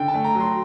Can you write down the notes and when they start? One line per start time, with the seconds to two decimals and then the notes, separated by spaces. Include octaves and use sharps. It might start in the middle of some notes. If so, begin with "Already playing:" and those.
Already playing: D3 G5
0.08 A5
0.14 A3
0.24 A#5
0.35 F#3
0.40 C6